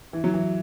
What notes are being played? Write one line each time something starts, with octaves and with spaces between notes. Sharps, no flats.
E3
F#3
E3